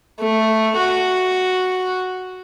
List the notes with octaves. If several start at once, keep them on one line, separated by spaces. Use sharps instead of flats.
A3
F#4